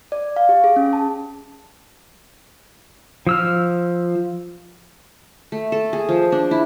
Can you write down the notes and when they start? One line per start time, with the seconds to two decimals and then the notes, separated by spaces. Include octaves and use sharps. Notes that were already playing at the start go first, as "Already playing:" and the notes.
0.12 D5
0.36 F5
0.49 G4
0.64 G#4
0.76 C#4
0.93 A5
3.27 F3 E6 F6
5.52 A3
5.72 A4
5.93 G#4
6.09 F3
6.32 D4
6.51 E4